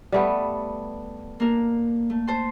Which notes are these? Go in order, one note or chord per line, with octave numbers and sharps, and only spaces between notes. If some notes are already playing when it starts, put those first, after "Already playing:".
G3 A3 B3
A#3 D4 A#4
A3
C5 A5 C6